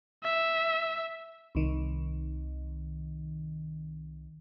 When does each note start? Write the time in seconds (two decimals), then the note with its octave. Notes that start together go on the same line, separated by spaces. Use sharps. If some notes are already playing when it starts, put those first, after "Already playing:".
0.23 E5
1.55 C2 D#3